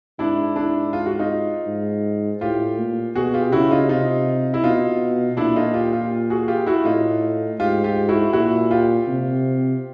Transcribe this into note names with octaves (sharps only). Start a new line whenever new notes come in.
G#2 D4 E4
D4 E4
F4
F#4
D#4 F4
G#2
A2 F4 G4
A#2
B2 F#4 G#4
F4 G4
C#3 E4 F#4
D#4 F4
C3 D#4 F4
E4
B2 D#4 F4
A#2 D4 E4
D#4 F4
F4 G4
F4 G4
F#4 G#4
F4 G4
E4 F#4
A2 D#4 F4
G#2 F4 G4
F4 G4
E4 F#4
A#2 E4 F#4
F4 G4
C3